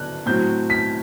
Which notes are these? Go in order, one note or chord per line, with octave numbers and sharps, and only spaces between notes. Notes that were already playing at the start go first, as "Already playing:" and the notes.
Already playing: D3 F#3 B3 D4 F#6
A2 F#3 C4 G6
B6